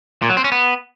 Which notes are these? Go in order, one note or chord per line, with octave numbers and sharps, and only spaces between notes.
A#2
F#3
C4
C#4
B3